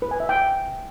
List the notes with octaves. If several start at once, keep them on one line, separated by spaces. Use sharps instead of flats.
B4
G#5
E5
G5